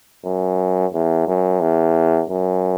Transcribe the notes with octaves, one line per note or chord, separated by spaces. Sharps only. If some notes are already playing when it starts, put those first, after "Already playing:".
F#2
E2
F#2
E2
F#2